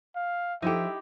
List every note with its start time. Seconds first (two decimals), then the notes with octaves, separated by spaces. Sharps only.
0.16 F5
0.62 F3 D#4 E4 G4 A4 E5